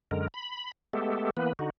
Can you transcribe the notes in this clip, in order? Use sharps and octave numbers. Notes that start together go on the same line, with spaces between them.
F#2 D3 G#3 A#4
B5
G#3 A3 B3 G4 A4
E3 A#3 B3 B4
D3 D#4 F#4